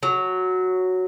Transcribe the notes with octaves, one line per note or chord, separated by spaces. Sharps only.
F#3